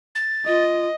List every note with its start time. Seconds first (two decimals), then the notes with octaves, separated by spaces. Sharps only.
0.15 A6
0.47 F4 D#5